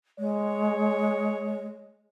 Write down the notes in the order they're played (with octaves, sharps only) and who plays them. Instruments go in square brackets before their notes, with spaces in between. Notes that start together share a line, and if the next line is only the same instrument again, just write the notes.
[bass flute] G#3 [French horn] C#5